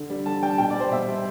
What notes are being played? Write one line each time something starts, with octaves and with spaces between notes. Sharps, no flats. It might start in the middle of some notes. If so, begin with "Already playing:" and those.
Already playing: D3
G3
D3 A5
G3 G5
A5
B2 G5
D5
G3 C5
B2 E5
G3